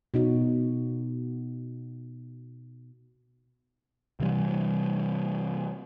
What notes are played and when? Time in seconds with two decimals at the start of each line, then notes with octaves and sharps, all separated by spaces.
0.14 B2 D#4 F#4
4.20 C3 E3 G3